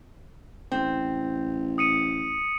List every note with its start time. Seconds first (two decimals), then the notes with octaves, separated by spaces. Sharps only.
0.71 A1 C4
1.78 D#6 C#7 D#7